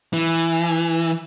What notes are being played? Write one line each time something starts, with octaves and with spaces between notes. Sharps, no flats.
E3